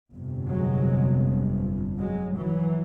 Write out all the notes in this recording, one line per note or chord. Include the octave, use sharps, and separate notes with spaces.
G1 F2 C3
F#3 G#3
F#3 G#3
E3 F#3